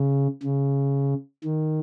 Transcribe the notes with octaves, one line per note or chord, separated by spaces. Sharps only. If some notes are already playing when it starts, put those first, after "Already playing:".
Already playing: C#3
C#3
D#3